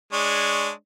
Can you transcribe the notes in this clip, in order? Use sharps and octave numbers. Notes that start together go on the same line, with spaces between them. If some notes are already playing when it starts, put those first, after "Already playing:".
G#3 D4 C#5